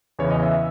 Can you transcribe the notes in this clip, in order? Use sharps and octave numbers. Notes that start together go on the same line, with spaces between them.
E2 C#3 E3 C#5
D#5
E5